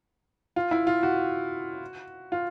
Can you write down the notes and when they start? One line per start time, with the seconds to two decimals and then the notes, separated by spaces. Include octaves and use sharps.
0.56 F4
0.71 E4
0.87 F4
1.03 F#4
2.32 F4